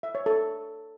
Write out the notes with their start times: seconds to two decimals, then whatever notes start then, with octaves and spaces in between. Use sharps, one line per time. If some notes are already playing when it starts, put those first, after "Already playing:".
0.03 E5
0.15 C#5
0.26 A4